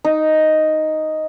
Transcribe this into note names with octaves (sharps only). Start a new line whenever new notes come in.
D#4